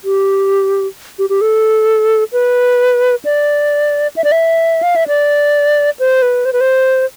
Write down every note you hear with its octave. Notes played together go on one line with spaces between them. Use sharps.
G4
G4
G4
A4
B4
D5
E5
D5
E5
F5
E5
D5
C5
B4
C5
B4
C5